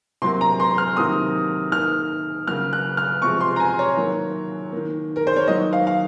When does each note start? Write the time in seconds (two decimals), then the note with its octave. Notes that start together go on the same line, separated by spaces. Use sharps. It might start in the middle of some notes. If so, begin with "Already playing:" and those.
0.22 C3 F#3 A#3 C6
0.41 A#5
0.60 C6
0.78 F6
0.97 C3 D#3 F#3 A#3 D#6
1.71 D#3 A#3 F6
2.47 C#3 F#3 A#3 F6
2.73 F#6
2.97 F6
3.22 C3 F3 G#3 C#6
3.40 C6
3.56 A#5
3.60 G#5
3.79 C#5
3.97 D#3 F#3 A#3
4.72 A#3
4.77 D#3
5.16 A#4
5.27 C5
5.36 C#5
5.47 D#3 F#3 A#3 D#5
5.73 F5
5.87 F5